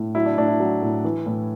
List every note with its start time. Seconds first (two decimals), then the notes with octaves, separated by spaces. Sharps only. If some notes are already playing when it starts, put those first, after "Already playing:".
Already playing: A2
0.15 F#3 E4
0.26 D4
0.38 A2 D4
0.48 E4
0.60 F#3
0.82 A2
1.05 E3
1.26 A2